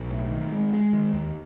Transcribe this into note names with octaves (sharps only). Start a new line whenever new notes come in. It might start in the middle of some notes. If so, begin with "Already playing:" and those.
Already playing: B1
A2
D#3
G#3
G#3
D#3
D#2